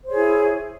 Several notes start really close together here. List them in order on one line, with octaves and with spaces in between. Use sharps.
C5 C#5 G#4 E4